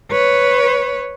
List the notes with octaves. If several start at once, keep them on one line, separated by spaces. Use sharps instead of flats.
B4 C#5